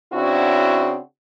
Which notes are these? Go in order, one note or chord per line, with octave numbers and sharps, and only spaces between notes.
C#3 C4 D4 E4 F#4